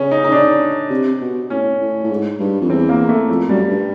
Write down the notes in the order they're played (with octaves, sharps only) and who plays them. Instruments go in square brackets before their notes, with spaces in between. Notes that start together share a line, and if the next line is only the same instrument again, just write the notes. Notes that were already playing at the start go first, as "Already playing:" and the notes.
Already playing: [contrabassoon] C#3 [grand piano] C#4
[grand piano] D#4
D#4
D4
[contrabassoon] C3
B2
[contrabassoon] A2 [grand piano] C#4
[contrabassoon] A2
A2
G#2
G2
F2
[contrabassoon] E2 [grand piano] C4
[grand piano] A#3
A3
[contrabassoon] F2 [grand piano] A3
[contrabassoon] F#2 [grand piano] G3
[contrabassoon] G2